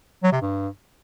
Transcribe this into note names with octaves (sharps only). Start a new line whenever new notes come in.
F#3
C3
G2